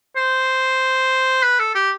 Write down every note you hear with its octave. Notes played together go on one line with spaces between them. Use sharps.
C5
B4
A4
G4